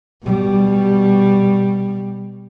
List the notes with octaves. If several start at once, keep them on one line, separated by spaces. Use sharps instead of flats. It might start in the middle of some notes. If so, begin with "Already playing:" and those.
B2 G3